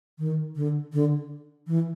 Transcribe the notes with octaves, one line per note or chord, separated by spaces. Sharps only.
D#3
D3
D3
E3